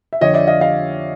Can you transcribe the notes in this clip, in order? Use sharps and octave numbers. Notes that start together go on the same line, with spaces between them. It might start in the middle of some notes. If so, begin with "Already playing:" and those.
E5
F2 D3 F3 C#5 D#5
D5 E5
D#5 F5
D#5 F5